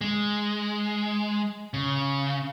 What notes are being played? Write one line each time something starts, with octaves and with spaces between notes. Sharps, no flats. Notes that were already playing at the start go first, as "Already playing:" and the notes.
G#3
C#3